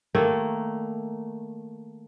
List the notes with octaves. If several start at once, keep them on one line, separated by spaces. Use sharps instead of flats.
D#3 A3 A#3